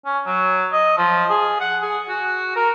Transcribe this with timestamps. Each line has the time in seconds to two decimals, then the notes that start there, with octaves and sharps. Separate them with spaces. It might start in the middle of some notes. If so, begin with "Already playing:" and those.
0.06 C#4
0.26 F#3
0.72 D#5
0.98 F3
1.30 G#4
1.61 F#5
1.82 G#4
2.09 F#4
2.56 A#4